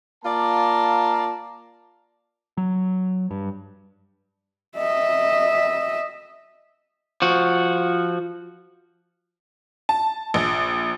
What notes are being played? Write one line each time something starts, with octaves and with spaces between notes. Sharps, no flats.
A#3 F4 D5 A5 A#5
F#3
G2
D#5 E5
F3 F#4
A5
A#1